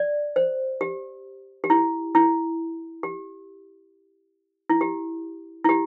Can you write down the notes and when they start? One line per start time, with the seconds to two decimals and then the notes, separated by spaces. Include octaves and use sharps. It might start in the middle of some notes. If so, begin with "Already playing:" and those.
Already playing: D5
0.36 C5
0.81 G4
1.64 G4
1.70 E4
2.15 E4
3.03 G4
4.70 E4
4.81 G4
5.64 E4
5.69 G4